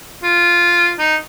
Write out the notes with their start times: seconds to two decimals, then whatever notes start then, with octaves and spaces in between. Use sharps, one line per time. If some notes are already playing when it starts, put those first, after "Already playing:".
0.23 F4
0.99 D#4